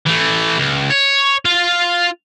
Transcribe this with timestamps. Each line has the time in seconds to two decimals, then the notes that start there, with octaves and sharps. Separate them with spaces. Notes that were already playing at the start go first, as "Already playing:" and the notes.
0.07 E3 A3
0.59 C#2
0.90 C#5
1.45 F4 F5